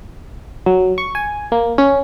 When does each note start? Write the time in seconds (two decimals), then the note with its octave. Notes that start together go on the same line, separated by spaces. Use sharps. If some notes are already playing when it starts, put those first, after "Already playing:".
0.66 F#3
0.98 C#6
1.15 G#5
1.52 A#3
1.78 C#4